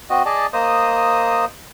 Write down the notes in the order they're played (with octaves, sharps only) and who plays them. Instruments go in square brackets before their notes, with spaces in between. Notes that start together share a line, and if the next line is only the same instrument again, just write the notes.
[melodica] C4 F#4 D#5
G#4 D5 D#5 A5
A#3 C5 D#5 D#6